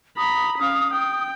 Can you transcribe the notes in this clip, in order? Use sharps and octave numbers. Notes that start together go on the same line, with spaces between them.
A#5 B5 D#6
C#4 F5
G5